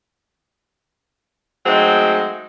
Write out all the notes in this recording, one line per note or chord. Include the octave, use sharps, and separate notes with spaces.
F#3 G#3 A3 C4 D#4 G#4